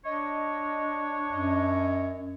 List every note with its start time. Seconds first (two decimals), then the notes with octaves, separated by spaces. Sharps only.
0.05 D4 C#5 D#5
1.32 F#2 D#5